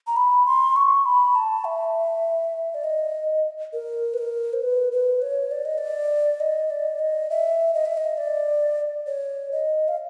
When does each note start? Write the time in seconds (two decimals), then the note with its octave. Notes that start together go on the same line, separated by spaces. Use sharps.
0.07 A#5
0.16 B5
0.46 C6
0.76 C#6
1.06 B5
1.35 A5
1.65 E5
2.74 D5
2.84 D#5
3.73 A#4
4.14 B4
4.18 A#4
4.53 C5
4.62 B4
4.92 B4
5.22 C#5
5.51 D5
5.65 D#5
5.78 D5
6.40 D#5
6.70 D5
6.99 D#5
7.30 E5
7.74 D#5
7.85 E5
7.97 D#5
8.18 D5
9.07 C#5
9.52 D#5
9.88 F5